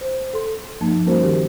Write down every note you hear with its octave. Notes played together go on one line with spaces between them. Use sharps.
C5
A4 C6
G2 F3 A#3 D#4 A5
G3 A#3 C#4 F#4 A#4 C5
D#3 G4